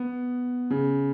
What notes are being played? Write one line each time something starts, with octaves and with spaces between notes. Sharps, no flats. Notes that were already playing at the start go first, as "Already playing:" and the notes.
Already playing: B3
C#3